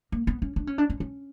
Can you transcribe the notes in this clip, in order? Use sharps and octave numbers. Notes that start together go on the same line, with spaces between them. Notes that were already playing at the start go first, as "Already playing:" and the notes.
A#3
B3
C#4
D4
C#4
D4
C#4
C#4